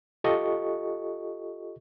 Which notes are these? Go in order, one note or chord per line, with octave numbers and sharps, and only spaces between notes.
F4 G4 A4 D#5 C#6